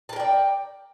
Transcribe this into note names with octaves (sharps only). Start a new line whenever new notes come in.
A#4 D5 G5 A5